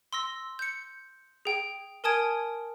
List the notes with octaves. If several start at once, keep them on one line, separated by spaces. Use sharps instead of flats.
C6 E6 A#6
G6 C#7
G#4 G5
A#4 G#5 A5 D#6 G#6 D7